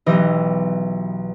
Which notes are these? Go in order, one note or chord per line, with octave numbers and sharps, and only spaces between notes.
B1 E3 G4 D#5